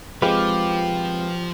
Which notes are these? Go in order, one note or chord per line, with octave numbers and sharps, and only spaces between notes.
F3 G#3 C4 F4 G4 B4